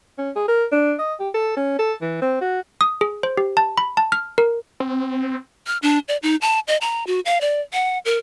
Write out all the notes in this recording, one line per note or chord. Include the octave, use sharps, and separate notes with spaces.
C#4
G#4
A#4
D4
D#5
G4
A4
C#4
A4
E3
C4
F#4
D#6
G#4
C5
G4
A5
B5
A5
F6
A#4
C4
F6
D4
D5
D#4
A5
D#5
A#5
F#4
F5
D5
F#5
A#4